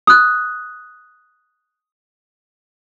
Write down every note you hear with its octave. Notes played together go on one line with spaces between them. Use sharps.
D#6 F#6